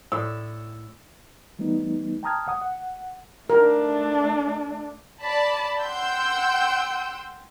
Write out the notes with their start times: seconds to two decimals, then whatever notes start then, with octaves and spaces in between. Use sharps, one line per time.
0.12 A2 C#5 D5 E6
1.59 E3 G3 A3 B3 D#4
2.23 G5 A5 A#5 D#6 F6 G#6
2.47 C#2 F#5 D#6
2.61 F#5
3.50 A3 D4 A#4
5.21 D5 A5 B5
5.80 F#5 G5 C6 E6 G6